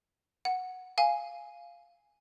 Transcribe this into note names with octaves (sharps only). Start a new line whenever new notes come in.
F#5
F5 G#5